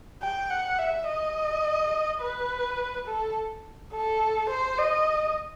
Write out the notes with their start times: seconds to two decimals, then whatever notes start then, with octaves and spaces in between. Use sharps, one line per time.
0.22 G5
0.50 F#5
0.78 E5
1.08 D#5
2.21 B4
3.07 A4
3.93 A4
4.50 C5
4.78 D#5